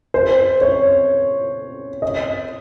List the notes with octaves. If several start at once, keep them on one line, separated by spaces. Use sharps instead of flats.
C5
C#5
D#5